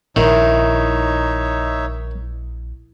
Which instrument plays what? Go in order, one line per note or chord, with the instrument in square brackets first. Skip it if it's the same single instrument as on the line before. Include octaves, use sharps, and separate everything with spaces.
[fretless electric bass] A#1 [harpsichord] D#3 [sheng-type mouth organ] D#4 C#5 E5 [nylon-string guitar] E4